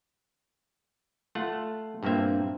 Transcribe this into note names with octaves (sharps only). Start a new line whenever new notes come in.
A3 F4 F#5
G2 A#2 A#3 C4 E5